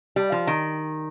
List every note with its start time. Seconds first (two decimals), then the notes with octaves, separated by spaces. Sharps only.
0.16 G3
0.32 F3
0.47 D#3